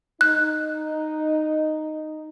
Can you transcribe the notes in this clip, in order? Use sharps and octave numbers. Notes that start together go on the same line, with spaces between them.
D#4 F#6